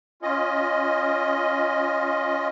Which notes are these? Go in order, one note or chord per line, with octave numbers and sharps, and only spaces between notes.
C#4 F4 D#5